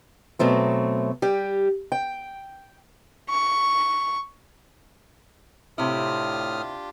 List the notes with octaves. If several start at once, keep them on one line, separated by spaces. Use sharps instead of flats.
B2 F#3 A3 C4
G3 G4
G5
C#6
A2 C3 D4 E4 F4 G4 D#6 F6